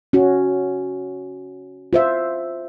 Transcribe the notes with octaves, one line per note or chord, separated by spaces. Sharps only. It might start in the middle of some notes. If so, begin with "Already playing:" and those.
C#4 F#4
F4 C5 E5